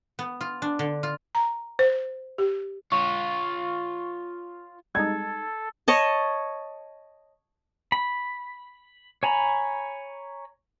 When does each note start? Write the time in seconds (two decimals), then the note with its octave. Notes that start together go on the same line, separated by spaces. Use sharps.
0.19 B3
0.41 F4
0.62 D4
0.79 D3
1.03 F4
1.35 A#5
1.79 C5
2.38 G4
2.92 F4 C#5 C#6
4.95 G3 G#3 D#4 A4 G#6
5.88 C#5 D#5 A5
7.92 B5
9.23 C#5 G#5 A#5 B5